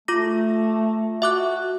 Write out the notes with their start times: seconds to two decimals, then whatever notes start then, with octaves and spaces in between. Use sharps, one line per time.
0.08 A3 F4 D6 A#6
1.22 F#4 E5 D6 F#6